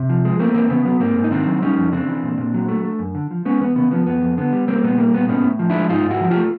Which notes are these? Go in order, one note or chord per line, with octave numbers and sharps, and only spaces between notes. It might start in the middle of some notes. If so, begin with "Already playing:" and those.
Already playing: C3
F3
G#3
A3 A#3 C4
E2 A#3 C4
C#3 B3
F#3 B3
G#2 A#3 C4
G#2
D#4
D#3 C4 D4
F#3
G3 C#4 D#4
F2
C#3 C4 D4
E3
A#2
A#2
F#3
A3
A3
F#2
D3
F3
G#3 B3 C#4
E2 B3
C#3 B3
F3 B3
F2 B3
F2
D3 B3
G3
G3 A#3 C4
C4
A#2 B3
G3 A#3
A#2 B3
A2 B3 C#4
A2
F3
D4 E4
G#3
G#2 D#4 F4
G#2
E4 F#4
F3
F4 G4
A3